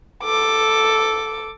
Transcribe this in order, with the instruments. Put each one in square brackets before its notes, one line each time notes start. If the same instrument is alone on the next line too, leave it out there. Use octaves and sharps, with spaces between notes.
[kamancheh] A4 D6